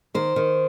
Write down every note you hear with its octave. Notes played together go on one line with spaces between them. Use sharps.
D#3 C5
D#3